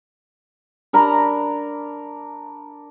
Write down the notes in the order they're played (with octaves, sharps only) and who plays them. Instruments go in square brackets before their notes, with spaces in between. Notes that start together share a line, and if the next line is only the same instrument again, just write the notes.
[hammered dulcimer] D4 A#4 A#5 B5